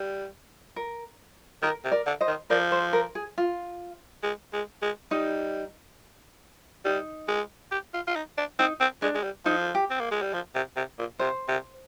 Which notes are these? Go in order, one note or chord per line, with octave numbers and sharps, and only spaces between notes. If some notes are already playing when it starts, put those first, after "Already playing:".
Already playing: G3
A#4
D#3 A#4
C3
A#4 D5
D3
C5 D#5
D#3
F3 A#4 D5
C5
A#4
G#4
F4
G#3
G#3
G#3
G3 D#4
G3 D#4
G#3
G4
F4
F4
D#4
D4
C4 D#4
C4
G#3 D4
G#3
G3
F3 D#4
G4
C4
A#3
G#3
G3
F3
C3
C3
A#2
C3 C5
C3